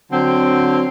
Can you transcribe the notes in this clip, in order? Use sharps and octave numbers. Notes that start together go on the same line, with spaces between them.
D3 F#3 C4